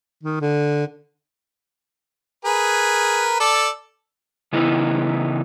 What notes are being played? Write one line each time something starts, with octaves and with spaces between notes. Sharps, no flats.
D#3
D3
G#4 A#4 B4
A4 D5
C#3 E3 B3 D#4 E4